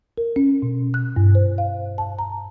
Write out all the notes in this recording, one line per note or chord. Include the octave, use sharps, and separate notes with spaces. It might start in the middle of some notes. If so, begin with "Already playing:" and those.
A#4
C#4
B2
F#6
G2
C5
F5
A5
A#5